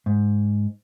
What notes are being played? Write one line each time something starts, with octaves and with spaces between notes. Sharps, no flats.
G#2